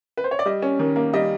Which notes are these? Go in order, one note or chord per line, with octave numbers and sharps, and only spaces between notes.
B4
C5
C#5
D5
G3 D#5
C#4
D#3
A#3
G3 D#5